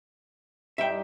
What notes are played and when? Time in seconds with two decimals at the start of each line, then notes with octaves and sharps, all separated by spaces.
0.78 G2 D#4 E5 G5